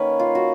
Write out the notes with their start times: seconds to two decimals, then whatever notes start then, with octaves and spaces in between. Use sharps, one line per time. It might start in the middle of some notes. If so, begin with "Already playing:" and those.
Already playing: D#3 A#3 C#4 B4 C#5
0.19 F4
0.35 F#4